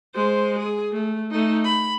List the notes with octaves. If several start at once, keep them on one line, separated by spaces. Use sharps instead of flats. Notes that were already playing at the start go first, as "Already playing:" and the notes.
G#3 C5
G#4
A3
A3 D#4
B5